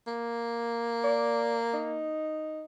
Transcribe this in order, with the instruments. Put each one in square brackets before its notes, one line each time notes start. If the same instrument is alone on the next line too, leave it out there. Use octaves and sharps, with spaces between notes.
[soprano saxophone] A#3
[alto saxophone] D5
D#4